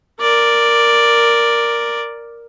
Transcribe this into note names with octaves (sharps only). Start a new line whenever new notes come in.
A#4 D5